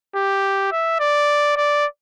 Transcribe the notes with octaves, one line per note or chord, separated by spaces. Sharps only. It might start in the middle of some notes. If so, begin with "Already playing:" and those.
G4
E5
D5
D5